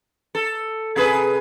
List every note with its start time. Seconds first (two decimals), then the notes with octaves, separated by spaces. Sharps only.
0.35 A4
0.96 C3 G#4 B4